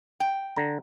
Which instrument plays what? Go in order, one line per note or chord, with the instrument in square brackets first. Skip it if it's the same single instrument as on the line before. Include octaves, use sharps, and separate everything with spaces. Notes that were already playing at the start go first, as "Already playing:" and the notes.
[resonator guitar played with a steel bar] G5
[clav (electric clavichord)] D3 A#5